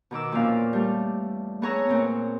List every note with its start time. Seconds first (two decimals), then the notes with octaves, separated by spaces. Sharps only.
0.11 B2 D#3 D6 E6
0.32 E2 A#2 F3 C#4 D5 F5
0.73 G3 A3
1.61 A3 B3 G#4 C#5 A#5 E6
1.89 A#2 B3 C4